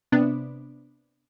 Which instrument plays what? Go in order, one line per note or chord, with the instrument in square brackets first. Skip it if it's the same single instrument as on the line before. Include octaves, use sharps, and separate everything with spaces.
[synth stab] C3 B3 D4